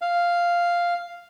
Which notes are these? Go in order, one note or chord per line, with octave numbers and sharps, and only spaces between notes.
F5